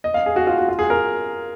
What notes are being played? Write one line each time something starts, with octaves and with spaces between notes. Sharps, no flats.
D#5
F5
G#4
F#4
F4
F#4
F4
G#4
A#4